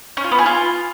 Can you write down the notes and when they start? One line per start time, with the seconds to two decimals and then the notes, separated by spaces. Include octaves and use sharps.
0.17 C#4
0.24 F4
0.31 B3
0.39 G#4
0.46 F4